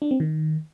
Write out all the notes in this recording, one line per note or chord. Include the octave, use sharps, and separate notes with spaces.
D4
C4
D#3